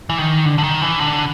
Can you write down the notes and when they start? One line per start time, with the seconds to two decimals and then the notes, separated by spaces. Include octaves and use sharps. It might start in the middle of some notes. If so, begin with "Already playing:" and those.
0.10 E3
0.18 D#3
0.45 D3
0.58 D3
0.63 D#3
0.82 E3
1.00 D3